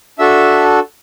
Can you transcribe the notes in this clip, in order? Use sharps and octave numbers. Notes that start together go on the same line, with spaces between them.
D4 F#4 A4 E5